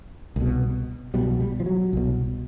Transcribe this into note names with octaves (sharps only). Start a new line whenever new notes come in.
C2 B2
C2 B2 G3
F#3
G3
F3
F#3
C2 B2